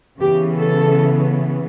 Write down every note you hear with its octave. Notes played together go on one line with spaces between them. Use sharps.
C#3 E3 B3 G4
A4